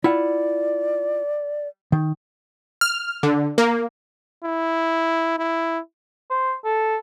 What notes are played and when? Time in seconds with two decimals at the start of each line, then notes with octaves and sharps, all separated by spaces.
0.04 E4 F4 D5 F#5
1.92 D#3
2.81 F6
3.23 D3
3.58 A#3
4.45 E4
5.39 E4
6.30 C5
6.65 A4